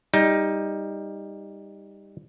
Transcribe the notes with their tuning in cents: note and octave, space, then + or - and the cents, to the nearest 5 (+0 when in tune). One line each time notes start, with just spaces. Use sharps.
G3 +20 D#4 +10